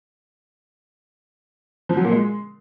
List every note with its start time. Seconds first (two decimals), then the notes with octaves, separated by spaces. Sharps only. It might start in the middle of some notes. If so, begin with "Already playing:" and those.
1.89 F3
1.97 F#3
2.05 A#2
2.12 G#3